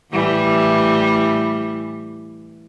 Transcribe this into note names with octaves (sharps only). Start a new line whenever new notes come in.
A2 E3 G3